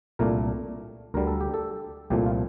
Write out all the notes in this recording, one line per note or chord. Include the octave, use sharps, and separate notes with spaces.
C2 A#2 A3 D4 A#4
D2 D3 G3 A#4
A4
G4
A4
C2 A#2 F3 A3 G4
F4